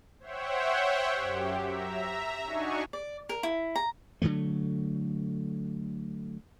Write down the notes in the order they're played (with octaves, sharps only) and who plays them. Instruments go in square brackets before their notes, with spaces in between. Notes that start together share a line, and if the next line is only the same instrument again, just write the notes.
[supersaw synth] C5 C#5 E5 F#5 G5
F#2 G4
E5 A#5
D4 D#4 F#4 G#5 C#6
[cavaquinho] D5
A#4
E4
A#5
[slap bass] D3 D#3 F#3 A3